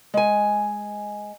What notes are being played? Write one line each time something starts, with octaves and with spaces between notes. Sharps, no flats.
G#3 G#5